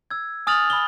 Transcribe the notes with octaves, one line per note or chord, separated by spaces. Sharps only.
E6 G#6
G#5 D#6 F6 A6 F7 F#7
G#5 B5 D#6 G7